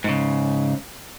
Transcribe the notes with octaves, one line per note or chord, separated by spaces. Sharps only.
G#2 C#3